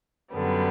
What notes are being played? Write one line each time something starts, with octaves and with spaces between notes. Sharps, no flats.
F#2 D3 G3 B3